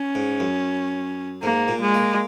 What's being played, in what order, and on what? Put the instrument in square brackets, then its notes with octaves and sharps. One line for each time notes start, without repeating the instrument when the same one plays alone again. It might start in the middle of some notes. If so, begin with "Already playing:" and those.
Already playing: [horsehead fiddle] C#4
[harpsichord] G#2
F#2
[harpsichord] G#2 [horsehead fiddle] A#3
[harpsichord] A#2
[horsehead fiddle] G#3
[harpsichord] A#3